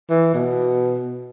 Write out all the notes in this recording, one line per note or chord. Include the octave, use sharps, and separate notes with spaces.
E3
B2